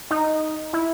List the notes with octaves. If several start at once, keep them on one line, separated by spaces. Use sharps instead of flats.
D#4
E4